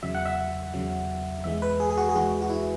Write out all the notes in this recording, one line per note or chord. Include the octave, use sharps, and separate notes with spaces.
E2 C#3 F#3 E5
F#5
E5
E2 C#3 F#3
E2 E3 G#3 E5
B4
G#4
G#4
F#4
G#4
E2 E3 G#3 F#4
F#4
E4